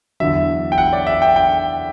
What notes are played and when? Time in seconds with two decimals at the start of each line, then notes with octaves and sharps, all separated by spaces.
0.20 E2 D3 F#3 E5
0.72 G5
0.78 F#5
0.93 D5
1.07 E5
1.22 G5
1.36 G5